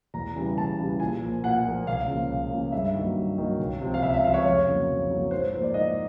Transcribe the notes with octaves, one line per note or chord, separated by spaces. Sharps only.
E2 A#5
C#3 E3 G3
E2 A5
C#3 E3 G3
A#2 G#5
F3 A#3
A#2 F#5
F3 A#3
C#2 F5
C#3 F3 A#3
C#2
C#3 F3 A#3
G2 E5
D#3 F#3 A#3
G2
D#3 F#3 A#3
C#2
C3 F3
F5
C#2 E5
E5
C3 F3 F5
C#5
F2 C#5
C#3 F#3 A#3
F2
C#3 F#3 A#3
G#2 C5
C5
F3 A#3 C5
D5
G#2 D#5